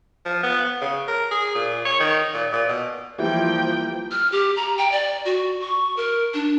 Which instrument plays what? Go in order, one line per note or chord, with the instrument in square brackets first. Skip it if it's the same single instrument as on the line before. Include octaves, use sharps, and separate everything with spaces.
[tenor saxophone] F3
B3
C#3
A#4
G#4
A#2
C#5
D#3
A#2
A#2
B2
[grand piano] E3 G3 A#3 [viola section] F3 G5
[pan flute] F6
G4
A#5
G5
D5
F#4
C#6
A#4
D4